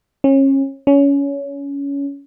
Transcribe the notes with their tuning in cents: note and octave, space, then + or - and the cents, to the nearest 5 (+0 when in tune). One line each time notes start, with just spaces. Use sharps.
C#4 -30
C#4 +20